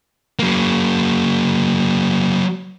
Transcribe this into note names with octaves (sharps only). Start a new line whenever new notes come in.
F#3 A#3